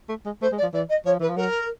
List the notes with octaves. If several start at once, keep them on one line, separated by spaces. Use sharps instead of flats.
A3
G#3
A3 C5
G#3
D5
F3
E3 D5
D#5
F3 C#5
E3 B4
F3
F#3 A#4